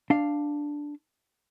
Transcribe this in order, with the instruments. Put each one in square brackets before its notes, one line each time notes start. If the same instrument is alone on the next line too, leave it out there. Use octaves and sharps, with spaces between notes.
[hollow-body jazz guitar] D4 F5